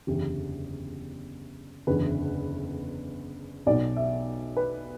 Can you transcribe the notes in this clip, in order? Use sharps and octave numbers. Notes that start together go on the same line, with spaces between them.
F#1 E2 D3 G4
F#1 E2 D3 B4
B1 B2 D5
E5
B4